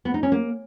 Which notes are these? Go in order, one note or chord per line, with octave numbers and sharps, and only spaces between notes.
B3
D#4
C#4
A#3